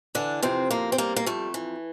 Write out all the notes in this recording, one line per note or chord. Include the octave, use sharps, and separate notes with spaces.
D3 E3 D4
F2 C3 C4
C3 A#3
C4
G3 A#3
A#3
F2 A3
E3